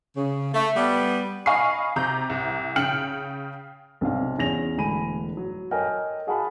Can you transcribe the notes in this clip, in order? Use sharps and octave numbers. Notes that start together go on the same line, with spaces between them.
C#3
A3
G3 B3
D#5 F5 G#5 B5 C#6 C7
C3 A#5 G6
C2
C#3 G5 F6 C#7 F#7
B1 C3 C4 D4 F5
E2 C#4 A#6 F7
E1 A2 D3 G#5 B5 D#7
F#3
A4 A#4 C#5 D#5 G5 G#5
F#4 G#4 F5 F#5 A5 B5